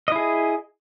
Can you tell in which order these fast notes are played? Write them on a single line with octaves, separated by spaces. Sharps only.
D#5 E4 G#4